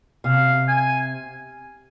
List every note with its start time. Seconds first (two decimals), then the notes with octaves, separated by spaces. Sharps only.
0.24 C3 F5
0.68 G#5